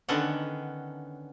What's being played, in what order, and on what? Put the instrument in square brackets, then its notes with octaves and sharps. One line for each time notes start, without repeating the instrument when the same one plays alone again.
[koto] D3 D#3 B3 C#4 A4 F#5